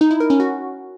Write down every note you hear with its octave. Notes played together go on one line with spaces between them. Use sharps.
D#4
E4
A#4
C#4
F#4